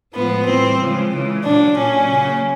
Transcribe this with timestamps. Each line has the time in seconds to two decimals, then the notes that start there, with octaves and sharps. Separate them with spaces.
0.13 A2 F3 G#3 B3
0.46 A2 E3 G3 C4
0.79 C#3 F3 G#3
1.11 C#3 E3 G#3
1.44 A#2 F#3 A#3 D4
1.77 A#2 F#3 A#3 C#4
2.09 C#3 F#3 A#3